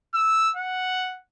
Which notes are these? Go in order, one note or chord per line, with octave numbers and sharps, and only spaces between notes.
E6
F#5